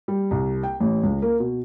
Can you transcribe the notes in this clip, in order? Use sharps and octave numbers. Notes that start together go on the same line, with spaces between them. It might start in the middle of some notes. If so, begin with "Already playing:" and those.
G3
C2
G5
A1
C#2
A#3
B2